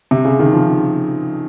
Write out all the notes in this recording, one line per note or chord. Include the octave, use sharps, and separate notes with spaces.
C3
C#3
D#3
F3